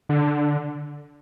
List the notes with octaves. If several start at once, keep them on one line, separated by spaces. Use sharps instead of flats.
D3